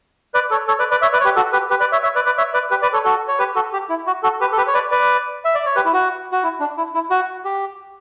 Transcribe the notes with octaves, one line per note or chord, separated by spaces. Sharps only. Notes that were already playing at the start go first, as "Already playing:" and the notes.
B4 D5
A4 C#5
A4 C#5
B4 D5
B4 D5
C#5 E5
B4 D5
C#5
G4 B4
F#4 A4
G4 B4
G4 B4
B4 D5
C#5 E5
C#5 E5
B4 D5
B4 D5
C#5 E5
B4 D5
G4 B4
B4 D5
A4 C#5
F#4 A4
C#5
G4 B4
F#4 A4
G4
E4
F#4
F#4 A4
G4 B4
A4
G4 B4
C#5
B4 D5
B4 D5
E5
D5
C#5
G4 B4
E4
F#4
F#4
E4
D4
E4
E4
F#4
G4